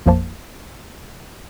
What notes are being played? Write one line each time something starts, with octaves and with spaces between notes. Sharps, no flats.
A1 F2 F3 A#3 C5 A5